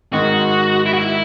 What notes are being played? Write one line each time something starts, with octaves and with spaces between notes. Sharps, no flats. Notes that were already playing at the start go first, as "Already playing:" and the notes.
G#1 G#2 D#3 G#3 F#4
E4
F#4
E4